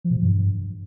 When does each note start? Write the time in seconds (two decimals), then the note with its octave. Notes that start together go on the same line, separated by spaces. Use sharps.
0.04 F3
0.10 B2
0.16 F3
0.22 G2